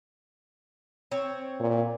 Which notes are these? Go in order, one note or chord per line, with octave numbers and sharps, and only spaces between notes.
C4 C#5
A#2